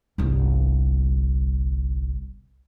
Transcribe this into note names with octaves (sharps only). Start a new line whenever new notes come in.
G1 C2